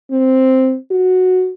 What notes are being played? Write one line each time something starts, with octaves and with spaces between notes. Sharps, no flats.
C4
F#4